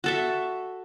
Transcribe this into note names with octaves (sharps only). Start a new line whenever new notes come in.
F#4 A4 E5